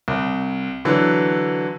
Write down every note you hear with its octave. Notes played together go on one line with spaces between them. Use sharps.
C2
D3 E3 F#3